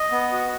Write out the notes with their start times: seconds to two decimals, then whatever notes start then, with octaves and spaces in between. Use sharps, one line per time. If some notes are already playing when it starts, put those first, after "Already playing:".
Already playing: D#5
0.12 B3
0.32 F#4